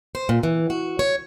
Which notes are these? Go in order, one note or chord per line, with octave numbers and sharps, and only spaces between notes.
C5
A#2
E3
F#4
C#5